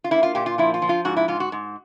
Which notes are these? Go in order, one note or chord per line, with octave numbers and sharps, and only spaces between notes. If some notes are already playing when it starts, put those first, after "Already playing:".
F4
A#3 E4
F4
A#2 G4
F4
F3 E4
F4
F3
F4
G#2 F#4
E4
G#2 F4
F#4
G#2